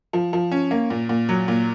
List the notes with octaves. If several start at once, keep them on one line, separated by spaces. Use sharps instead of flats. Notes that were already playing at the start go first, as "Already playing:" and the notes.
F3
F3
C#4
A#3
A#2
A#2
F#3
A#2